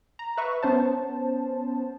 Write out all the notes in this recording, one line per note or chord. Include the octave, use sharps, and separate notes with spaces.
A#5
B4 E5 C#6
B3 C#4 C5 A5